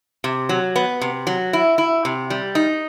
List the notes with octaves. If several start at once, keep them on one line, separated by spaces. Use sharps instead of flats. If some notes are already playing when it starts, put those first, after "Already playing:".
C3
F#3
B3
C3
F#3
E4
E4
C3
G3
D#4